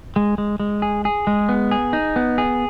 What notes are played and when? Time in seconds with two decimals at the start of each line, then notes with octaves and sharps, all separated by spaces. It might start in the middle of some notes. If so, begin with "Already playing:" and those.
0.16 G#3
0.38 G#3
0.60 G#3
0.82 G#4
1.05 G#4
1.27 G#3
1.49 B3
1.71 G#4
1.93 D#4
2.16 B3
2.38 G#4